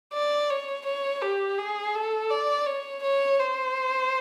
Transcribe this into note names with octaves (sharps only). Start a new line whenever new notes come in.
D5
C#5
C#5
G4
G#4
A4
D5
C#5
C#5
C5